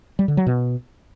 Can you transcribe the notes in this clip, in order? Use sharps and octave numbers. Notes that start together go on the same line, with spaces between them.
G3
D3
F#3
B2